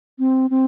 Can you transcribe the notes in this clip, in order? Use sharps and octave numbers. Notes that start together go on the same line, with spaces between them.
C4
C4